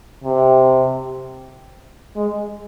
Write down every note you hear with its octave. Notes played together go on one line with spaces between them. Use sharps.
C3
G#3